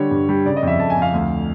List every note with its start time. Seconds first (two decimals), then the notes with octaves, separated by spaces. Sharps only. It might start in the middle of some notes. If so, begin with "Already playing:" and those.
Already playing: D3 G3 C#5
0.11 G2
0.29 G3
0.46 C#3 D5
0.56 D#5
0.63 F2 E5
0.79 F2 A5
0.90 G#5
0.97 F2
1.02 F5
1.14 D2